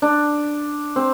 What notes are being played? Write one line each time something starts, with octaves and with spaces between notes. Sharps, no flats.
D4
C4